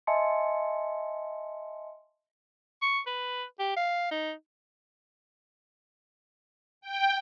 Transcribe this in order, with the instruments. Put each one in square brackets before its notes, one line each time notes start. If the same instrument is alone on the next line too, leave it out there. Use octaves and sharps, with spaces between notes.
[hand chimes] D#5 E5 G#5 A5 C6 C#7
[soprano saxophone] C#6
B4
G4
F5
D#4
[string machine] G5